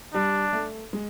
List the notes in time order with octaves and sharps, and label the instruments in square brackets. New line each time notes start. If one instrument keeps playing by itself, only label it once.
[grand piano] G3 [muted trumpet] D4
[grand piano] A3
G#3